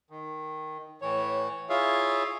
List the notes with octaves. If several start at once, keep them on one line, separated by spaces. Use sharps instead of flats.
D#3
A2 E3 C#5
E4 F4 G#4 C#5 E5 F5